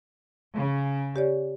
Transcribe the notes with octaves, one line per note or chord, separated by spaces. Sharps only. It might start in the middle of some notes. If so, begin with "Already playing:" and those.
C#3
G4 C#5 D5